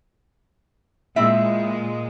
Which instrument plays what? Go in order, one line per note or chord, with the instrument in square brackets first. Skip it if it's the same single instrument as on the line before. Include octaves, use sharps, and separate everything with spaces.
[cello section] A#2 G#3 [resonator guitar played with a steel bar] C4 E4 E5